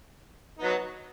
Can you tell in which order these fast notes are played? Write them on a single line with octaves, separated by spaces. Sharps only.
D#4 B3 F#3